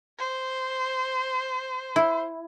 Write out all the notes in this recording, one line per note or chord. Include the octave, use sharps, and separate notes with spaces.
C5
E4